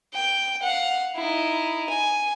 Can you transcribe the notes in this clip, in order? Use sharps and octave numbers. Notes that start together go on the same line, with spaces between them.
G5
F5 F#5
D#4 E4
G#5